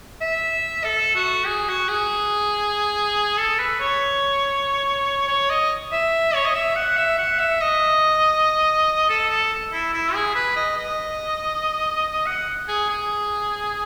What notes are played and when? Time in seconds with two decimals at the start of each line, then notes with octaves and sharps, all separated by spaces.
0.21 E5
0.84 A4
1.15 F#4
1.47 G#4
1.69 F#4
1.89 G#4
3.38 A4
3.59 B4
3.80 C#5
5.28 C#5
5.50 D#5
5.92 E5
6.34 C#5
6.45 D#5
6.55 E5
6.76 F#5
6.97 E5
7.18 F#5
7.39 E5
7.61 D#5
9.09 A4
9.30 A4
9.73 E4
9.93 E4
10.14 G#4
10.35 B4
10.56 D#5
10.77 D#5
12.26 F#5
12.68 G#4
12.90 G#4